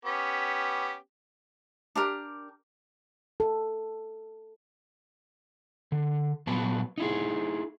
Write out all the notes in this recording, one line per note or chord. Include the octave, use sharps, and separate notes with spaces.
B3 C#4 G4
D4 G4 A#4
A4
D3
A#2 F#3 B3 B4 A5
D#4 E4 G#4